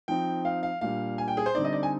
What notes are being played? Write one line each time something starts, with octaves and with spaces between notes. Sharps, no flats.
F3 C4 D#4 G5
F5
F5
A#2 G3 D4 F5
G#5
G5
G#4
C5
D3 G3 C4 D#4 D5
D#5
D5
G#5